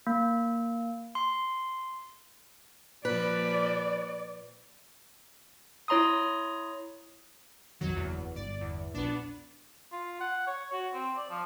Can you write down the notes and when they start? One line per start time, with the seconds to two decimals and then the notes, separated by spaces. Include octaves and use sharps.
0.07 A#3
1.15 C6
3.05 A#2 F3 B4 D5
5.88 E4 C#5 A#5 C6 D#6
7.81 B1 F2 D#3 F#3
7.96 F#1 E2
8.36 G1 D5
8.61 E2
8.94 A#1 B3 D4
9.92 F4
10.21 F#5
10.47 C#5
10.73 F#4
10.94 C4
11.17 D5
11.30 F3